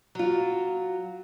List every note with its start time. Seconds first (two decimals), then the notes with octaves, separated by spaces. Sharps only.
0.15 F#3 F4